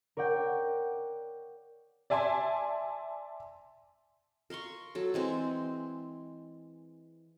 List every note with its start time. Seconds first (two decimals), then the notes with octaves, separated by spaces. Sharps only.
0.17 A#4 C#5 D5 F#5 G5
2.10 D5 E5 G#5 A5 C6
4.50 A#4 F5 C6 C#6
4.95 F#3 A4
5.14 E3 G#3 C4